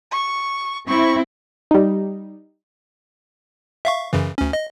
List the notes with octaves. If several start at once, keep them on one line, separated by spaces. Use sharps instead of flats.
C#6
C4 E4 C#6
G3 D#4
E5 F5 C#6
F#2 C#3 E3
D2 C#4
D#5